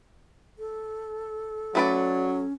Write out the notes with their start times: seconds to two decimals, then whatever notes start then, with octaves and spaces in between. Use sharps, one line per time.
0.59 A4
1.75 F#3 A3 C#4 B4 D5